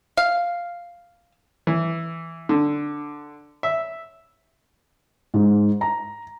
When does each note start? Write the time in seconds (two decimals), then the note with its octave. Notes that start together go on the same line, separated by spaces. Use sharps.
0.17 F5
1.67 E3
2.49 D3
3.63 E5
5.34 G#2
5.81 A#5